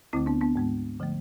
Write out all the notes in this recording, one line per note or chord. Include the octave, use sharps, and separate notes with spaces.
D2 D3 A3 C4 E4
B3 D4
B3 D4
G#2 G#3 B3
D3 F3 A3